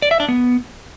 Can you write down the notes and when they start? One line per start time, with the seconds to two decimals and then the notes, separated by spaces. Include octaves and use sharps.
0.02 D5
0.11 E5
0.20 D4
0.28 B3